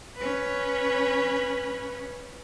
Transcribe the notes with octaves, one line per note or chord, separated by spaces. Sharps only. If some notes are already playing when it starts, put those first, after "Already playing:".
C#4 B4